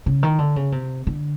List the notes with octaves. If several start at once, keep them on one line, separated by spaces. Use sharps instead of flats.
C#3
D#3
D3
C#3
C3
D3